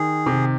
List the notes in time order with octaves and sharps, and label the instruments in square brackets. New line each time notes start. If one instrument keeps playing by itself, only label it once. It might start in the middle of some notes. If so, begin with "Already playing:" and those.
Already playing: [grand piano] D#3 [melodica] G#4
[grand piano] C3